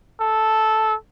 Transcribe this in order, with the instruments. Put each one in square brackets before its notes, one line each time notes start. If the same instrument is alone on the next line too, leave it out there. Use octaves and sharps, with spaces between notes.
[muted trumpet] A4